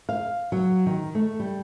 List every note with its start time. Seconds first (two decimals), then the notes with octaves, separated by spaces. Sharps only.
0.09 F5
0.52 F#3
0.86 D#3
1.15 A3
1.40 G3